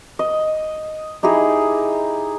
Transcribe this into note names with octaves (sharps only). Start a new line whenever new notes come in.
D#5
D#4 E4 G4 G#4